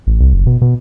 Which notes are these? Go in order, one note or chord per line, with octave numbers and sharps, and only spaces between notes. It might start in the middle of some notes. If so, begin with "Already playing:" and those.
A1
C2
F#1
B2
B2